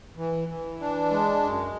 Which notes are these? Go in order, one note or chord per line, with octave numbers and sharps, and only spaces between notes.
E3
E3
D4
G#3
F#2